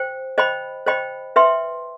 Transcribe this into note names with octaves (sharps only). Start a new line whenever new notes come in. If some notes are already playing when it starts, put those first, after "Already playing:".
Already playing: C5 G5
C5 D#5 G5 B5
C5 D#5 G5 B5
B4 E5 G5 C6